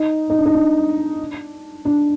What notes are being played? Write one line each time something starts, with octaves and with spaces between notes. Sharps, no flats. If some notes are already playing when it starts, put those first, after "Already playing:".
Already playing: D#4
D#4
D4
D#4
D4
D4